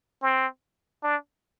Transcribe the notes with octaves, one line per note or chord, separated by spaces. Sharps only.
C4
D4